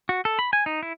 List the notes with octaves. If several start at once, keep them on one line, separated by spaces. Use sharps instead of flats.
F#4
A4
B5
G#5
D#4
E4